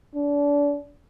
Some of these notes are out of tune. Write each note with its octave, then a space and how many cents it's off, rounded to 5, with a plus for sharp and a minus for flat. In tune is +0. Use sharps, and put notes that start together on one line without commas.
D4 -30